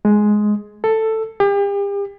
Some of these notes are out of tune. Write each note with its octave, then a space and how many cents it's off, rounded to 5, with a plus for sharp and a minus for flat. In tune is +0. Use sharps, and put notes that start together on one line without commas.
G#3 +10
A4 +10
G4 +40